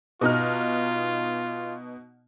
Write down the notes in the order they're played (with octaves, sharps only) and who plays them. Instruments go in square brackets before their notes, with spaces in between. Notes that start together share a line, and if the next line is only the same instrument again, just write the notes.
[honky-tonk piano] B2 D#4 F6 [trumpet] F4